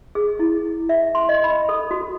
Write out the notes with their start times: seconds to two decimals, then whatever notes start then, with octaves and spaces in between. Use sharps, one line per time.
0.15 G#4
0.39 E4
0.89 E5
1.15 C6
1.29 D#5
1.44 B5
1.69 A4
1.91 F#4